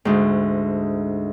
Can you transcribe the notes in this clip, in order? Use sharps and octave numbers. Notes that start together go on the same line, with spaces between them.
D2 G#2